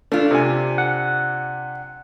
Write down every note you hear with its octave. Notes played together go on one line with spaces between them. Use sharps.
A3 D4 F4
C3 G#5
F#5